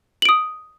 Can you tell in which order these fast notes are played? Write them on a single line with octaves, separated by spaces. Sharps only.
F#7 D7 D#6